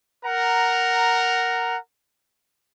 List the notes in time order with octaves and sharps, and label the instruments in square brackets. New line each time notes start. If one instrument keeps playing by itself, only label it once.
[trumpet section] A#4 F#5 A#5